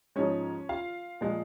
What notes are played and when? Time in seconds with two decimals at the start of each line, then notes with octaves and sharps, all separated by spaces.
0.16 G#2 F3 G#3 C#4 C#5
0.69 F4 F5
1.21 A#2 F3 G#3